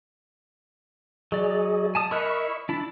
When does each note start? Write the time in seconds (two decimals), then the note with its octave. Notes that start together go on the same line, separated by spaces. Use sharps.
1.32 F#3 G#4 D5 D#5
1.95 G#5 A5 D#6
2.11 E4 A#4 D#5 B5 C#6 F#6
2.69 D4 E4 A5